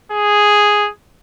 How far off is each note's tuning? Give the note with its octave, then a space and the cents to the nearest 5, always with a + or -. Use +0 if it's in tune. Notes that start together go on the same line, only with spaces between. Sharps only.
G#4 +0